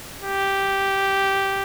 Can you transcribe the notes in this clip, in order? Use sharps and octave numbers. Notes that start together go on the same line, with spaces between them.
G4